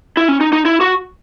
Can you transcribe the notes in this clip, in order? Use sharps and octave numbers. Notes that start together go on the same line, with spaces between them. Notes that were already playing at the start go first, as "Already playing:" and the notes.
E4
C#4
D#4
D#4
E4
F#4